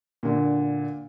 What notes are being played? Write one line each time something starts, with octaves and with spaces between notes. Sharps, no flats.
A#2 D3